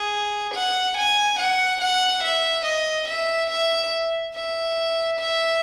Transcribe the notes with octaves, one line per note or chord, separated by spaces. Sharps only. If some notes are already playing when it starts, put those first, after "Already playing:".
Already playing: G#4
F#5
G#5
F#5
F#5
E5
D#5
E5
E5
E5
E5